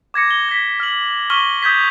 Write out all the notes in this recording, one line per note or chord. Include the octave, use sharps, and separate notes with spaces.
D6 G#6 A#6 C#7
G7
G#6 B6
F6 F#7
C#6 D6 F6 B6 G7
D#6 G6 G#6 B6